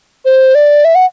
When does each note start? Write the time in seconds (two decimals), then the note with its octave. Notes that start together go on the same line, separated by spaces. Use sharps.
0.25 C5
0.55 D5
0.85 E5
0.95 F#5